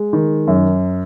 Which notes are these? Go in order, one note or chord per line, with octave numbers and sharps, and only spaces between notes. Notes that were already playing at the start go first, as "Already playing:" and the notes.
Already playing: G#3
D#3
F#2